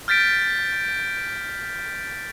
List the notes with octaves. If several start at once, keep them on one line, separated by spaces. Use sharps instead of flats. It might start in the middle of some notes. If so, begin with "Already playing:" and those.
F6 G6 A6 B6 D7